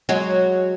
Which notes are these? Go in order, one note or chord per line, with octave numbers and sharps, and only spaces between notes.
F#3 G#3